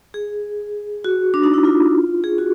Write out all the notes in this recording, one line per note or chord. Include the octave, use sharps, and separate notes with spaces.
G#4
F#4
D4
D#4
E4
F4
G#4
F#4